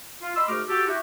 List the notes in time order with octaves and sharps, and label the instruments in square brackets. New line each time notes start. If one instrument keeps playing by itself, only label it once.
[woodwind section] F4
D#5 B5 C6 E6
G#2 A3 F#4 A#4 D6 F6
F#4 G4 A4
E4 F#4 G4